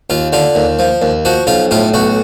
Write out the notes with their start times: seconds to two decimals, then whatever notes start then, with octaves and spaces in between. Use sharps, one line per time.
0.10 D#2 F4
0.33 D3 F4
0.55 D#2
0.79 F3
1.02 D#2
1.25 F3 F#4
1.47 B1 F4
1.71 A2 F4
1.94 B1 F#4